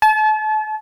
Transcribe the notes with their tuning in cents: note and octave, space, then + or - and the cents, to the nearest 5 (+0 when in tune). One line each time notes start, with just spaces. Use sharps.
A5 -35